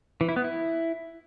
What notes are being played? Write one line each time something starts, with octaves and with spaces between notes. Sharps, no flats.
E3
E4
B3
E4